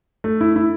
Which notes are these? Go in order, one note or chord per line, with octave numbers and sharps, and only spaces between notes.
A3
E4
E4